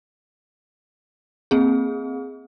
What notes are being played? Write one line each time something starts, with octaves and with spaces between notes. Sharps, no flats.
A#3 C4 G#4